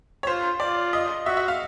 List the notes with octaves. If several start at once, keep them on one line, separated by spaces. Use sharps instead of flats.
C#5
F4 C5
F4 D5
D#5
F#4 E5
E5
F5